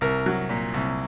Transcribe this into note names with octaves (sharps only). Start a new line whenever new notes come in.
C2 A#4
F#3
A#2
C2